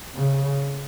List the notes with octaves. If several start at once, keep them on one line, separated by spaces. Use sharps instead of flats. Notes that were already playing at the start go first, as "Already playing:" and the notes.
C#3